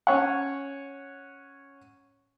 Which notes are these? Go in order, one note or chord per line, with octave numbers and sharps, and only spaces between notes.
C#4 C#5 F#5